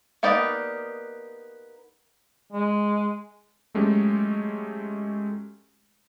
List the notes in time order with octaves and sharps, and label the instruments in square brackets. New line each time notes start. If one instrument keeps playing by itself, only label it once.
[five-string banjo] A#3 B3 D#4 G4 D5
[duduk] G#3
[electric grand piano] F#3 G#3 A3 C#4 G4